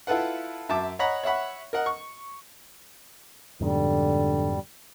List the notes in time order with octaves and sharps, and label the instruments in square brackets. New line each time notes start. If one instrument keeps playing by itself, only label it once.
[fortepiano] E4 F4 A4 B4 F#5
F#2 E5 A5 D6
C#5 D#5 F#5 A#5 B5
C#5 E5 F#5 B5
A#4 D#5 F#5
C#6
[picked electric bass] F2 G#2 B2 [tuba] D3 [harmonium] G3